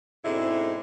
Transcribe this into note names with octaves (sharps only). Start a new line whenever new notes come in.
G#2 B2 D3 G#3 C4 E4